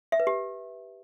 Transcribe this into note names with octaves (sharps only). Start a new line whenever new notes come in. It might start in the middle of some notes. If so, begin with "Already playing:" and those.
E5
B4
G4